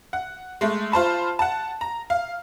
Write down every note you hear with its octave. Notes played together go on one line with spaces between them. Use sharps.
F#5
G#3 A3
F4 C5 A5 B5
F#5 A5
A#5
F5